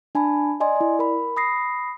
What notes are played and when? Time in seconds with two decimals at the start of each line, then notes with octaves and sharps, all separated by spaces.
0.15 D4 G#5 A5 B5
0.60 D5 D#5 G#5 C6
0.76 E4 D5
0.99 A#4 B5
1.36 B5 D#6 A#6 C7